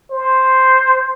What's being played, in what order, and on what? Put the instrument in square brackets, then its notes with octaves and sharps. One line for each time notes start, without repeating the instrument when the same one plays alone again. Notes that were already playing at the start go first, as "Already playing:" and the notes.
[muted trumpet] C5